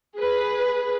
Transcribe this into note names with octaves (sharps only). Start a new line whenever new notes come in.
G#4 B4